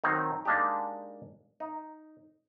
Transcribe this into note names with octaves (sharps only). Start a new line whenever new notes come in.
D#3 F#3 C4 D#4
G#3 A#3 D4 D#4 G4
D#4